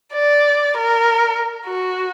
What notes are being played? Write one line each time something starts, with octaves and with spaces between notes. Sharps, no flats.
D5
A#4
F#4